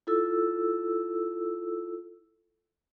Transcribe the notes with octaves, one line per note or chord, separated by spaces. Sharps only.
E4 F4 A4 E6